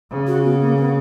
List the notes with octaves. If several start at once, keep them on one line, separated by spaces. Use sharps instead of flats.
C#3
F#4
B3
A#3
B3